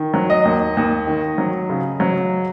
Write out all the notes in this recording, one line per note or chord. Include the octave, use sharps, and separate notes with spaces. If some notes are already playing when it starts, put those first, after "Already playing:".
Already playing: D#3
F#3
D#5
D#2
D#2
D#3
F#3
C#3
F#3